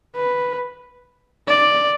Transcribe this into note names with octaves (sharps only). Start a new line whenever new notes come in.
B4
D5